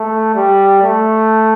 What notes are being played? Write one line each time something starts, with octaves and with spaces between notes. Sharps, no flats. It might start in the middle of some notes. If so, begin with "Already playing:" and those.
Already playing: A3
G3
A3